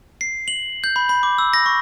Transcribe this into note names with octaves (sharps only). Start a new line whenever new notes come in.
C7
F#7
G6
B5
B5
D6
E6
A#6
C#6